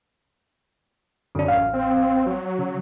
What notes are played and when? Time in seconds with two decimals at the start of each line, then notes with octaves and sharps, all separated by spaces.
1.35 F#2 D3 D4
1.48 A1 F5
1.73 C4
2.26 F#3
2.59 C#3